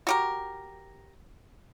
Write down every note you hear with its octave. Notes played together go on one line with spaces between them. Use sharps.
F#4 G4 A#4